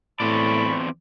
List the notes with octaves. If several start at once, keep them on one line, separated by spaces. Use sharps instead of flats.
E2 A2 C4 D5 A5 B5 C#6